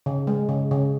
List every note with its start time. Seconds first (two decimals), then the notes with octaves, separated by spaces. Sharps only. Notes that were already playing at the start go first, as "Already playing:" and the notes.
0.06 C#3
0.27 G#3
0.49 C#3
0.71 C#3